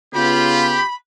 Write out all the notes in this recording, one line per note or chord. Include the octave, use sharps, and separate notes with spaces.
C#3 B3 F4 G4 B5